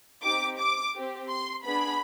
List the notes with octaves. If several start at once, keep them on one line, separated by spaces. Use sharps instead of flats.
C4 D#4 G4 D6
D6
C4 G4
C6
B3 D4 G#4 B5